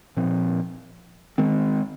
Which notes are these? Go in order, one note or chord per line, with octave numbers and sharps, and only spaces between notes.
A#2 F3 C4
D#3 G#3 C4